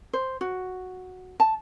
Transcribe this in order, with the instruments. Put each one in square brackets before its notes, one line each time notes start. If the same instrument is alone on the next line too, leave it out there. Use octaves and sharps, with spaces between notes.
[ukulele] C5
F#4
A5